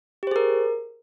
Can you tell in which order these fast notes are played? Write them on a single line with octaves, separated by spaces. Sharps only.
G4 C5 G#4 A#4